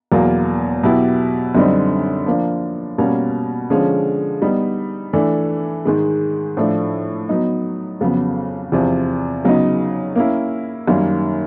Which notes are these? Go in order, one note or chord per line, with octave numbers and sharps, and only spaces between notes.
E2 B2 F#3 A#3
B2 F#3 B3 E4 G4
F#2 D3 G3 C4 D#4
F3 A#3 D4
B2 G3 A#3 C#4
D3 F3 G#3 C#4
G3 B3 D#4
E3 A3 D4
G#2 D#3 G#3
A2 F3 A3 D4
F#3 B3 D#4
F2 C#3 F#3 B3
E2 C3 F3
C#3 F#3 B3 D#4
A#3 C#4 E4
F#2 D#3 G3 A#3 C#4